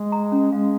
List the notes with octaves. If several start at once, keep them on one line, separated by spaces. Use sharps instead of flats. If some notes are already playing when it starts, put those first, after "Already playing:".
Already playing: G#3
A#5
C#4
G#3 F5